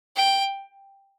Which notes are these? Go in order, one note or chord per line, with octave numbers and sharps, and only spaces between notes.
G5